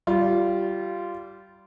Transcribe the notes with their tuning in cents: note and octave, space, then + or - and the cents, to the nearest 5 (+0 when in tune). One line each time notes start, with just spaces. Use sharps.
G3 -25 F4 -15